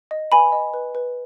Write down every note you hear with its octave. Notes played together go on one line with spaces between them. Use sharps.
D#5
B4 G#5 B5
D#5
B4
B4